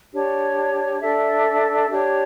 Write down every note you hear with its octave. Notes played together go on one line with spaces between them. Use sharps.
D4 G4 C#5
D4 A4 E5
D4 G4 C#5